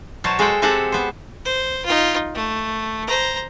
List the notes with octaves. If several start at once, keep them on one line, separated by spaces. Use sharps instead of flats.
B2 F#3 C5 C#5 A5
G#3 A4 C5 F#5 G5
G#3 C4 G4 A4 C5 F#5
B3 C5
C5
D#4 F4
A3
C5 A#5